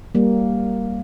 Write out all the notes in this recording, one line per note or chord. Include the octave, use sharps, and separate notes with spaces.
G3 A#3